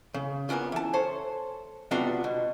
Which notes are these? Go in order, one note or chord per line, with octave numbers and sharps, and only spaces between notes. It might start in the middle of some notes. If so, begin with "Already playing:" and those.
C#3
A#3 B3 C#4 D4 F4
E3 A5
A4 C5 C#5
C3 G3 B3 D4 F4 F#4
B2